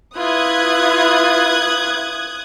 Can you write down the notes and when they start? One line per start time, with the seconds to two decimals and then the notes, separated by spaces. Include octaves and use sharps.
0.17 E4 F4 B4 D#6 F#6 G#6